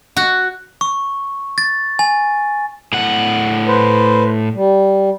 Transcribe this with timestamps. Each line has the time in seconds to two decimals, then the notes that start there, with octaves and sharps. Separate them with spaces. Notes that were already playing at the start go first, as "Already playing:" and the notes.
0.17 F#4
0.81 C#6
1.58 A6
1.99 G#5
2.93 A2 F#5
3.67 B4 C5
4.54 G3